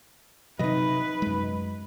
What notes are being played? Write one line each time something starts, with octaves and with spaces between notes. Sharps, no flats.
C3 F#3 D#4 B4 D#5
F#2 G#3